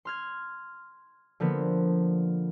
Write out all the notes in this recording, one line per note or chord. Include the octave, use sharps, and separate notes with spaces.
C6 F6 G#6
D3 F3 A#3 B3